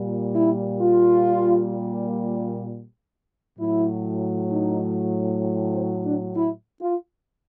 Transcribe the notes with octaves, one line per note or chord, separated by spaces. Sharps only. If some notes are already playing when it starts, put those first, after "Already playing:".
Already playing: A#2 G3
E4
F4
A2 F#3 E4
D#4
C4
D4
E4
F4